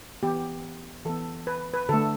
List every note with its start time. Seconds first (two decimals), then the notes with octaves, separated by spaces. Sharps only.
0.23 E3 B3 G4
1.05 E3 B3 A4
1.47 B4
1.74 B4
1.89 D3 A3 A4